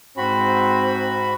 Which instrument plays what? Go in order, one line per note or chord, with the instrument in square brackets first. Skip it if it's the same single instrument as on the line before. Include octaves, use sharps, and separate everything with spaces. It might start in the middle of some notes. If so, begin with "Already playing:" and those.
[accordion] G#2 F#4 B5 [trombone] C4